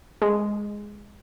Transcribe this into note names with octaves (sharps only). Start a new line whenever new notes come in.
G#3